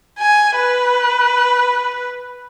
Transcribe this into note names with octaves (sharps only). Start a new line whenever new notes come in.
G#5
B4